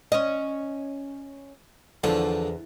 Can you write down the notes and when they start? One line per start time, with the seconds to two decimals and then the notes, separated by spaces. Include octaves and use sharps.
0.12 C#4 D#5
2.04 E2 D3 F3